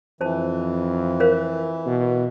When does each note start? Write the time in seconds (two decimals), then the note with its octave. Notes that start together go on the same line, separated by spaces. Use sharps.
0.21 F2 E3 C5 A5
1.20 A#4 C5 F5
1.86 B2